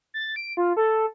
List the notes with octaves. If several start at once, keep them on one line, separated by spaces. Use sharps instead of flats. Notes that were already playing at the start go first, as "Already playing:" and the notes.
A6
D7
F4
A4